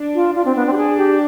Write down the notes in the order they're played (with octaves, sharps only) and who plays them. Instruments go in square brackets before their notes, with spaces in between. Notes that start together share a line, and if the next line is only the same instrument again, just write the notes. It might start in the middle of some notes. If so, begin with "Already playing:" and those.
Already playing: [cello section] D4
[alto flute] F4
[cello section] D4 [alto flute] F4
[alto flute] C4
B3
C4
G4
G#4
G4